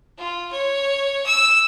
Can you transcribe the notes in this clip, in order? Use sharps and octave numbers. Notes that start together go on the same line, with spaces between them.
F4
C#5
E6